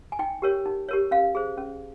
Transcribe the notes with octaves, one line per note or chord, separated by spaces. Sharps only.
G#5
D#4 G5
G4 A#4 C#5
D#4
G4 A#4 C#5
C#4 F5
G#4 C5
C#4